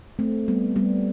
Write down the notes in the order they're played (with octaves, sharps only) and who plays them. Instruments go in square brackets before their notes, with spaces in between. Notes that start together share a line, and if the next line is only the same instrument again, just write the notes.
[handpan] A3 C4
G3 B3
G3 B3